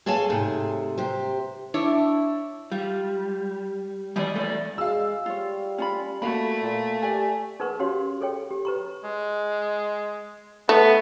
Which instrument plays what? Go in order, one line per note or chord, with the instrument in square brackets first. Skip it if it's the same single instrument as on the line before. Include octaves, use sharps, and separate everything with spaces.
[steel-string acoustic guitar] G#4 A4 C#5 F5 G#5 A5
G#2 C3 A3 G#4
C3 G4 C5
[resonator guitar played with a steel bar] D4 E4 C#5
[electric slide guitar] G3 [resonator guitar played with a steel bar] F4
[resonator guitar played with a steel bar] B2 E3 D#5 [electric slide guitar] G3 D5
[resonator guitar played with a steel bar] E2 [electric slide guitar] A3 D5
[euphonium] G#3 [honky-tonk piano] F5 E6
[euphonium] G3 [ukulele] F4 C#5
[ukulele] C#4 F4 B5
[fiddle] A3 [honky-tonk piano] A#3 [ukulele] F#4 B5
[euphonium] A#2
[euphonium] G4 [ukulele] D5 G#5
[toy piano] D#4 G#4 A#4 B4 F#5 C#6
C#4 F#4 G4 C#5 F5 C6
G#4 A4 C#5 G5
G4
B4 A#5 C#6
[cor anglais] G#3
[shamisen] A3 [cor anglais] B3